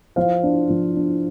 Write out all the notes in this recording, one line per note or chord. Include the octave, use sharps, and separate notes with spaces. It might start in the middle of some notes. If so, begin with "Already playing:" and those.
F3 C5 F5
D4
F3
D4